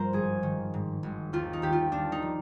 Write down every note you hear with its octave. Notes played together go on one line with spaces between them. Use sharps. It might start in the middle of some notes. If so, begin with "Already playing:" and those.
Already playing: G2 F3 A#4 C5
G#1 G#4
D#3
G#2
G#1
D#2 F4
D#4
D#2 G4
F4
D#2 D4
D#4
F3